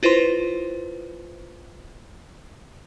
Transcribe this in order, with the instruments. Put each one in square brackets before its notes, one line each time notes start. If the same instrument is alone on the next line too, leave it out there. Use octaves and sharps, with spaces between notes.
[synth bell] E4 F4 B4 C5 C6